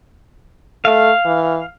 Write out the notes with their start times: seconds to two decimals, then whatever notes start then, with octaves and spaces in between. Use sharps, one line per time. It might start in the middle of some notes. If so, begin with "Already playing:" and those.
0.85 A3 F5
1.26 E3